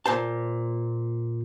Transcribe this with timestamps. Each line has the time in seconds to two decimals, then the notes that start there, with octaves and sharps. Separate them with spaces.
0.06 A#2 C5 A5